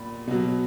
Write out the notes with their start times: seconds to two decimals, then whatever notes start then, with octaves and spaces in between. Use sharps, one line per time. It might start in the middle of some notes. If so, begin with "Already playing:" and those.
Already playing: A#2 B5
0.28 B2 F#3